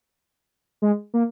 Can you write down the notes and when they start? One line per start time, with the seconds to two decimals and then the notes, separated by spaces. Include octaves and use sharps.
0.82 G#3
1.14 A#3